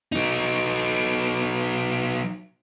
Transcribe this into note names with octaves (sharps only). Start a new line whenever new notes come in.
F#3 D#4